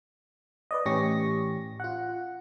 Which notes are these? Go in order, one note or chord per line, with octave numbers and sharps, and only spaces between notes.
B4 D5 D#5
A2 E3 C#4 G4 C#6 A#6
F4 F#5